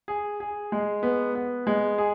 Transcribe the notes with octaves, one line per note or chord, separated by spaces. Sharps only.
G#4
G#4
G#3
B3
B3
G#3
G#4